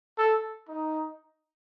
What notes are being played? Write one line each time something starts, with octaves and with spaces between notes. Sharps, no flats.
A4
D#4